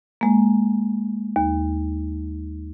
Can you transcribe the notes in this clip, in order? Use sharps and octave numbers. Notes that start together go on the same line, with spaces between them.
G#3 A#3
D#2